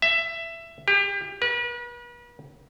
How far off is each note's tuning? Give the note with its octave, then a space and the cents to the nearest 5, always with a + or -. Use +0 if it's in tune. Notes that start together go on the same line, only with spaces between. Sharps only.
E5 +15
G4 +30
B4 -40